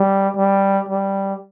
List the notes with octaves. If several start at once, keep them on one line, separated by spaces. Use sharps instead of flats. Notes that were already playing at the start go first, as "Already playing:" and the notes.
Already playing: G3
G3
G3